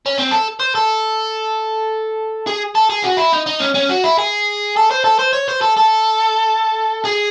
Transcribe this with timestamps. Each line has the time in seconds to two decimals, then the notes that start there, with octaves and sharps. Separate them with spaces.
0.06 C#4
0.18 C4
0.31 A4
0.60 C5
0.75 A4
2.47 G#4
2.75 A4
2.90 G#4
3.04 F#4
3.17 E4
3.33 D#4
3.47 D#4
3.60 C#4
3.75 C#4
3.89 F#4
4.04 E4
4.18 G#4
4.76 A4
4.91 C5
5.04 A4
5.19 C5
5.33 C#5
5.48 C5
5.61 A4
5.77 A4
7.05 G#4